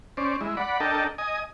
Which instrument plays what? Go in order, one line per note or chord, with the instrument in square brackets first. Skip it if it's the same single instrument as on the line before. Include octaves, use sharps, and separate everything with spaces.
[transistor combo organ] C#4 C5 D5
G#3 E4
D5 F#5 B5
D4 A4 A#4 D#5 G5 A5
D#5 G#5 D#6